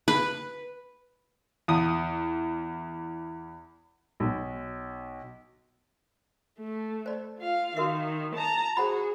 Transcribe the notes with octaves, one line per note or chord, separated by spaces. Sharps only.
B4
E2 D#6
B1
A3
C5 D5
F4 F5
D#3 F#4 A#4 E5
A5 A#5
F#4 G#4 C5 F#5 B5